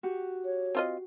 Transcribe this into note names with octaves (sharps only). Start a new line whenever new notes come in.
F#4 G4
C#5
C4 F4 D#5